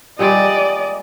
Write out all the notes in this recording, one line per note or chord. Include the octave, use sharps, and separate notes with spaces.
A#2 G3 G#3 D5 D#5